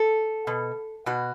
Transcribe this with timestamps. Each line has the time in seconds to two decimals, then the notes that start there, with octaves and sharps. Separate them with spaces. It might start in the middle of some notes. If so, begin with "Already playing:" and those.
Already playing: A4
0.47 B2
1.06 B2 F#4